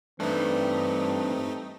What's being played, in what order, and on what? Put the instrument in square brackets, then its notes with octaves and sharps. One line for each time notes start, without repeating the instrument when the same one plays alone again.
[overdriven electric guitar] G2 D4 [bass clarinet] E3 [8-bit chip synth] A3 D#4 [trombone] C4